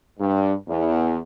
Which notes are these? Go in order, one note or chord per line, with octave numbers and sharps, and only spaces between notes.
G2
E2